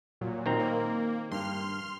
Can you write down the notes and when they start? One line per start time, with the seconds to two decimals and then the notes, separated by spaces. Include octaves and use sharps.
0.21 A#2 F#3
0.46 D#3 C4 A#5
0.59 A#3
1.32 G2 C6 F6